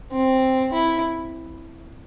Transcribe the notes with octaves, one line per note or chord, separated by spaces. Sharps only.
C4
E4